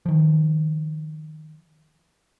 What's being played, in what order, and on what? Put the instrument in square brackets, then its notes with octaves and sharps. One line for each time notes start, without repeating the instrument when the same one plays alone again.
[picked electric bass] D#3 F3